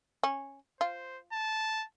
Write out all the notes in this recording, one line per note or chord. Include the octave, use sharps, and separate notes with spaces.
C#4
F4 C5
A5